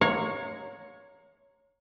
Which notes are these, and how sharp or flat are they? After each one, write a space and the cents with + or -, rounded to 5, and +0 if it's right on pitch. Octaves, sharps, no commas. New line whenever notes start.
C#5 +0 F5 +45 A#5 +0